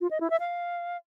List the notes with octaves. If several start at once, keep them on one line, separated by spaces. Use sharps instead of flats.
F4
D#5
E4
E5
F5